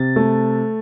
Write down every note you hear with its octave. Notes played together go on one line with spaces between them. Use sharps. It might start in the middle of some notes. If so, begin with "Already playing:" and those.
Already playing: C3 A6
A3